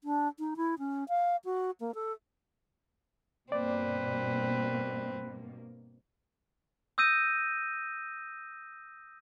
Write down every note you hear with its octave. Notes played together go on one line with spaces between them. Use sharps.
D4
D#4
E4
C#4
F5
F#4
A#3
A4
G2 B2 A#3 C4 B4 D5
D#6 E6 G6 A#6 D#7